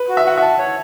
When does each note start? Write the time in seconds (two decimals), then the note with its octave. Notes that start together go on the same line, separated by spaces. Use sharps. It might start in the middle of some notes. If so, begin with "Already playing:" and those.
Already playing: B4
0.09 F#4
0.17 E5
0.25 F#4 F#5
0.37 E5 A5
0.58 C#5